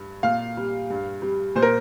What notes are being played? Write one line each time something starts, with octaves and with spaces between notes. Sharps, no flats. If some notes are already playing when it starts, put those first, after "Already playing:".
Already playing: G2
A#2 F5
G3
G2
G3
A#2 C5
A#4